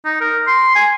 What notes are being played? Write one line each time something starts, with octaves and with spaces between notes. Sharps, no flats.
D#4
A#4
C6
G#5